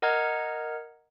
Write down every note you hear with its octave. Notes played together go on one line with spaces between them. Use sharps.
A#4 D#5 F#5 A#5 F6 G#6